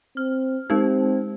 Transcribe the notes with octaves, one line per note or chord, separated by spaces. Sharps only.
C4 F6
G#3 C4 D#4 G4